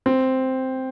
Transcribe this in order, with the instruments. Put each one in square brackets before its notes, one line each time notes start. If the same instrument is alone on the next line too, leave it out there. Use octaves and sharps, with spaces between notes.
[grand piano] C4